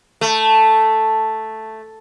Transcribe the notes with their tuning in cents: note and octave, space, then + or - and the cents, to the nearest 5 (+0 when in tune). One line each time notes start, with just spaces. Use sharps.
A3 +0